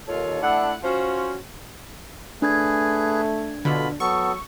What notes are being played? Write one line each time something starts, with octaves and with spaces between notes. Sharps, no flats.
D#2 D#3 F4 A4 C#5
A3 D4 E4 F#5
C#4 F4 F#4 C5
A3 D4 G#4 B4 G#6
B2 D3 F4 B5
F#3 B3 A4 C#6